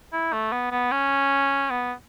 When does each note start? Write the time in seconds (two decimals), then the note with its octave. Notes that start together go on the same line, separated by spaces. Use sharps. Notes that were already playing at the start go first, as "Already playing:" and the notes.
0.13 E4
0.33 A3
0.52 B3
0.72 B3
0.92 C#4
1.70 B3